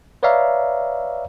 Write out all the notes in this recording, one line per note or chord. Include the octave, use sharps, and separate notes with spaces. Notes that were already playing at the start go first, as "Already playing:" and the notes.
B4 C#5 D5 E5 F5 A#5